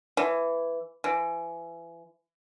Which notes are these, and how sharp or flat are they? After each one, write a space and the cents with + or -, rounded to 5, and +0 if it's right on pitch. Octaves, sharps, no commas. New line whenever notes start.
E3 +10
E3 +30